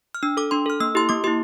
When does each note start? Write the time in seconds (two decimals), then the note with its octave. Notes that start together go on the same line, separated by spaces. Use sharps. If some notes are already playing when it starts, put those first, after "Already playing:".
0.15 F6
0.23 D4 E6
0.37 A4 D6
0.51 D4 C6
0.66 A4 F6
0.80 A#3 E6
0.95 E4 G4 C6
1.09 A#3 D6
1.24 E4 G4 C6